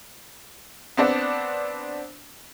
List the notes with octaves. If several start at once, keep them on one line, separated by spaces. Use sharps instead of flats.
B3 C4 D4